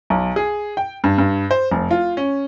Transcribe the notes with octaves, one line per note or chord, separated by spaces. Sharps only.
B1
G#4
G5
G2
G2
C5
F1
F4
C#4